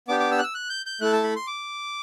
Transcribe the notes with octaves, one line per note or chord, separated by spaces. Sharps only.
B3 D4 G4 D6
D6
E6
F#6
E6
F#6
G6
G6
A3 E4 A4 F#6
A5
B5
C6
D6